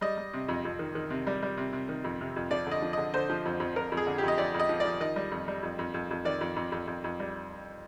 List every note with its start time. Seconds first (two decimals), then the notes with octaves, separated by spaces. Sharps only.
0.01 G3 D#5
0.17 G3
0.33 C3
0.48 F2
0.65 F2
0.79 D#3
0.95 D#3
1.10 C3
1.27 G3
1.42 G3
1.57 C3
1.73 C3
1.89 D#3
2.04 F2
2.21 C3
2.36 F2
2.51 F3 D5
2.66 D3 D#5
2.82 F3
2.93 D3 D#5
3.14 D3 C5
3.30 F3
3.45 F2
3.60 F2
3.76 F2 A#4
3.92 F2
3.97 G#4
4.07 D3
4.18 G4
4.23 F2 D#5
4.38 F2 D5
4.54 F2
4.59 D#5
4.69 F3
4.80 F3 D5
5.00 D#3 D#5
5.16 G3
5.31 F2
5.48 G3
5.63 F2
5.79 F2
5.94 F2
6.11 F2
6.25 D#3 D5
6.41 F2
6.56 F2
6.72 F2
6.87 F2
7.04 F2
7.20 G3